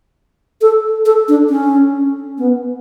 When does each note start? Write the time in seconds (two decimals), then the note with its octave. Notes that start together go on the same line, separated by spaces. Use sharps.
0.61 A4
1.05 A4
1.28 D4
1.50 C#4
2.38 B3